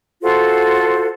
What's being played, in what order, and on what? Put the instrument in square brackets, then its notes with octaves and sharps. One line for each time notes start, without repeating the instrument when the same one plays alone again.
[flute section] F4 F#4 A4 C5